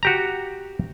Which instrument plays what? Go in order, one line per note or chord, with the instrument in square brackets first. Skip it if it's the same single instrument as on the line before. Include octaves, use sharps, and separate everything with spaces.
[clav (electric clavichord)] F#4 G4 A#5